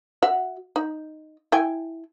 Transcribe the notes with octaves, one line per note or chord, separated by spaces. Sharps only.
F#4 E5 F#5
D#4
E4 G5 G#5